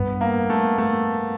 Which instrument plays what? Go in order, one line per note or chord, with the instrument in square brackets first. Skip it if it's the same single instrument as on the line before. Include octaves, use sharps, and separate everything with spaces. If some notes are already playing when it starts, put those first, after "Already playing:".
Already playing: [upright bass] G2 [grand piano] B3
[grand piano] A#3
A3
A3